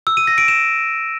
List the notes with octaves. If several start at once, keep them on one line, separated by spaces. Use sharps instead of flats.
E6
D#7
A#6
D7
E7